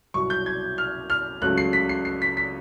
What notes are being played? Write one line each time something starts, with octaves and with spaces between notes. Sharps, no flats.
C2 B2 F#3 C#6
G6
G#6
F6
F6
C#2 C#3 F#3 A3 F#6
C7
B6
C7
C7
B6
B6